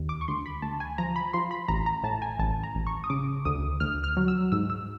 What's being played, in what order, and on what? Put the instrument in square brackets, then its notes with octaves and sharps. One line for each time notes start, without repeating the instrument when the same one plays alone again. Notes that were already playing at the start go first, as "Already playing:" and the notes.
Already playing: [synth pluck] D#2
D6
C#6
D2 C6
B5
D2 A5
G#5
F3 A#5
B5
F3 C6
B5
A1 A#5
A#5
A2 A5
G#5
A1 A5
A#5
A1
C#6
D#6
C#3 D6
D2 D#6
D2 F6
F6
F#3
E6
G#2 E6
E6